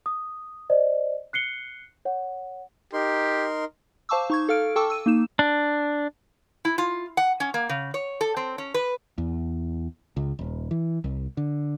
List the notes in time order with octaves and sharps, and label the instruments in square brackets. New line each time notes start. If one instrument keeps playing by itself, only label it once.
[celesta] D#6
C5 D5 D#5
F#6 C7 C#7 G7
C#5 F#5
[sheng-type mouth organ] D#4 A#4 C6 [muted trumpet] G4
[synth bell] C5 F5 A5 C#6 D6 E6
D#4 C#6 G#6
A4 F5 F6 D7
A4 G5 A5 C#6 D6 E6
E6 D#7
A#3 D#4 E7
[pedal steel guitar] D4
[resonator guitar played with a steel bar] E4
F4
F#5
C#4
A#3
C#3
C#5
A4
C4
C#4
B4
[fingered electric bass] E2
C#2
D#1
E3
C2
D3